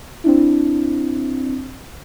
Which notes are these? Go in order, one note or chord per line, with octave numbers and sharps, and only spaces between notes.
C4 D4 E4